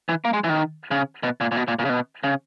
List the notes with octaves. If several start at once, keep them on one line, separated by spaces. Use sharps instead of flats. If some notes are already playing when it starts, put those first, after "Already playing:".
E3
A#3
G#3
E3
D#3
C#3
B2
A#2
A#2
B2
A#2
A#2
C#3
B2
C#3